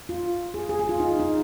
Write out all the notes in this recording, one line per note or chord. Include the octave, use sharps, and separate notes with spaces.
F4
G#4
G#4
G#4
F4
D#4
D#4